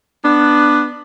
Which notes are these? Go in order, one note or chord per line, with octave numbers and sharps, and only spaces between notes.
B3 D4